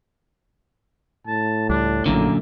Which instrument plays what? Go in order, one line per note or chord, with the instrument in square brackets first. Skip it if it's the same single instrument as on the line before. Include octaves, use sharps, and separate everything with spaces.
[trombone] A2 [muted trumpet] A5
[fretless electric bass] C#2 G3 [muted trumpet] D4
[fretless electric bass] D1 A#1 [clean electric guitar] F#2 A#2 D3 [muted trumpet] A#3